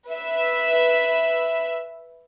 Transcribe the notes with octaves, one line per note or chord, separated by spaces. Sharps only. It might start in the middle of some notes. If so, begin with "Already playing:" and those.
B4 E5